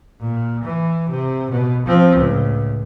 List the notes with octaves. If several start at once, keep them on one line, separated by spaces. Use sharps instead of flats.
A#2
E3
C3
B2
F3 C4
C#2 A2